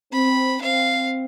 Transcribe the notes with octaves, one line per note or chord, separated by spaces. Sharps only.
C4 B5
C4 F5